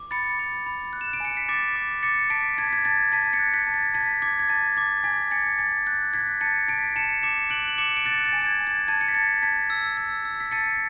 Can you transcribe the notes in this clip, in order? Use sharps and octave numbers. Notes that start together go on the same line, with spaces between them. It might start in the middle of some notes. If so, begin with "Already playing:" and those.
Already playing: D6
B5 A6 C#7
B5
B5
F#6
E7
D7
G#5 C#7
B6
D6 A6
D6
D6 A6 C#7
A5 B6 D7
A5 G#6 B6
G#6
A5 A6
A5 G#6 B6
A6 C#7
F#6
G#6 B6
A5
A6
A5 G#6 B6
D6 G#6
G#6
A5 A6
D6 A6
G#5 G#6 B6
G#5 A6 C#7
G#5 A6
F#6 A6
F#6 G#6 B6
A5 A6 C#7
A5 B6 D7
A5 C#7 E7
D6 C#7 E7
F#6 D7 F#7
F#7
D6 C#7 E7
D7
F#6 A6 C#7
A6
G#5
A6
G#6
G#5
A6
A5 G#6
C#7
B6
A5 A6
A5 G#6 B6
E6
E6
E6
B6
A5 A6 C#7